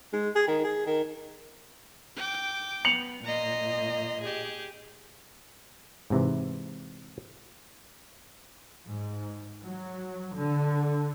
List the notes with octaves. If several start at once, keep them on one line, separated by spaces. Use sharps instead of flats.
G#3
G#4
D#3
G#4
D#3
G5 D6
B3 C#7 F7 F#7
A#2 D#5 A#5 C6
G4 G#4
G#2 C3 E3
G#2
F#3
D3